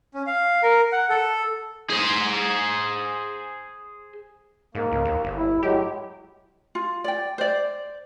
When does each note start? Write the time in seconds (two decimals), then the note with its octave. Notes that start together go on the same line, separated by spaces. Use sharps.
0.14 C#4
0.27 F5
0.63 A#4
0.92 F#5
1.09 A4
1.90 G#4 C5
4.75 G#2 A#3
4.92 C#2
5.05 D#2
5.24 G1
5.37 E4
5.63 A2 F#3 G#3 G4
6.75 F4
7.04 D5 G5
7.38 C5 D5